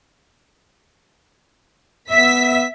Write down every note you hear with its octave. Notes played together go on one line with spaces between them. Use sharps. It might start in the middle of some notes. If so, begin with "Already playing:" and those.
B3 E5 B6